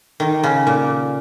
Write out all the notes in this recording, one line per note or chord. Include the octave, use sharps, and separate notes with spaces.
D#3
C#3
A#2